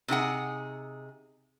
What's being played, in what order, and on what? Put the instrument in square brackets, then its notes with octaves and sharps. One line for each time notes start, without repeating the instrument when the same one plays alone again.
[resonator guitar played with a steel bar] C3 D#4 G#4 F#5